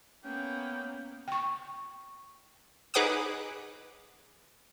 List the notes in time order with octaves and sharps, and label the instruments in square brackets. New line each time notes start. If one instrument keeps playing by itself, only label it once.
[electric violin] A#3 B3 [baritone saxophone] C#4 [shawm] G5
[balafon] G5 C#6
[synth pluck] D#4 G#4 B4 F#5 D6 D#6